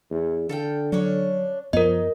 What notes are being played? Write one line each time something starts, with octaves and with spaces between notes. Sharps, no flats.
E2
D3 A4 F5 G5
F#3 C#4 D4 C#5
F#2 F3 B3 D#4 A#4 D#5